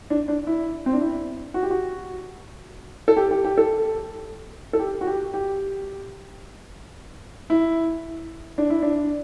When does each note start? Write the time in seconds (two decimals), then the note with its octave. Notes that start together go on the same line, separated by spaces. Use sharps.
0.10 D4
0.28 D4
0.47 E4
0.86 C4
0.93 D4
1.01 E4
1.54 F#4
1.63 G4
1.70 F#4
3.08 A4
3.17 G4
3.31 G4
3.44 G4
3.58 A4
4.73 A4
4.79 G4
5.01 F#4
5.07 G4
5.34 G4
7.50 E4
8.58 D4
8.70 E4
8.82 D4